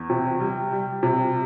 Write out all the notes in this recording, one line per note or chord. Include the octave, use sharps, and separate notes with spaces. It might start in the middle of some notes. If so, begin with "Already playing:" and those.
Already playing: E2
C3
G3
G3
C3